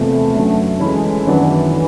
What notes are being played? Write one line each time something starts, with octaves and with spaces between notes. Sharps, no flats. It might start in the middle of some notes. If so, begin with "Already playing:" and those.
Already playing: E2 C3 F3 A3 A#3
F#2 D3 F#3
E3 G#3 A3 C#4 E4
F#2 D#3 E3 F#3 B3 D4
D3